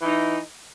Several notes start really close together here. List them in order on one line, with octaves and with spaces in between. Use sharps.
E3 D#4 E4